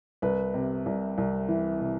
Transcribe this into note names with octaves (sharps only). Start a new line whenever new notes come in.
C2 B4
C3
C2
C2
E3
C3